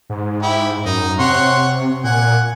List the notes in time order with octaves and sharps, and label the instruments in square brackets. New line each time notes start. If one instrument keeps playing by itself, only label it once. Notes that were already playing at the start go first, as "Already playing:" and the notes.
[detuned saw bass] G#2
[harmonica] E4 G4
[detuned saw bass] F#2 [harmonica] D#4 A#5
[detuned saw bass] C3 [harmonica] C#5 F#5 C6
[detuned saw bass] A#2 [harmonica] F#5 G#5